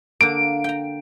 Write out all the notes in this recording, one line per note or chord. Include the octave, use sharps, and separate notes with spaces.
D3 A#3 D7
G5 A#5